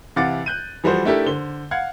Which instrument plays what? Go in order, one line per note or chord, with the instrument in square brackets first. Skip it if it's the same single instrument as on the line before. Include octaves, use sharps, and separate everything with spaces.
[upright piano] C3 E3 F5 F#5 D6 A6
F#6 G6 D#7
E3 F3 G3 F#4 A4 C5
A3 D4 E4 G4 A4 A#4
D3 C5 G7
F5 F#5 G#6